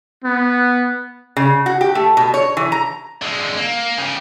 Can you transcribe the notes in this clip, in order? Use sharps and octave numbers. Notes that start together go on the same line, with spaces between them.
B3
C#3
F#4
G4
A3
B2
C#5
E3
A#5
D3 G#3
A#3
C#3 G4